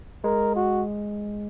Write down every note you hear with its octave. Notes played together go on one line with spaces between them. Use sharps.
G#3 A#4
F#4